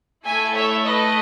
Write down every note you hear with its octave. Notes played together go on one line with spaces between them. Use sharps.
A3 E4 A4 E5 G#5
C#5 E5
B4 D#5